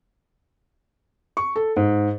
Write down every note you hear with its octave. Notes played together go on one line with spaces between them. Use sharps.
C#6
A4
G#2